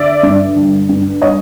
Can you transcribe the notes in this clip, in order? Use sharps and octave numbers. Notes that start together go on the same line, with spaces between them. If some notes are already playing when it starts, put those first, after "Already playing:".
Already playing: D3 D5 E5
G2
D3
G2
C#5 D#5